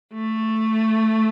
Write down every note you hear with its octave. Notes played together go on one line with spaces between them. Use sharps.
A3